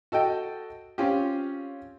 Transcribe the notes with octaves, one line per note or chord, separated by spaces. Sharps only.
F#4 A4 D#5 G5
C4 C#4 F4 G4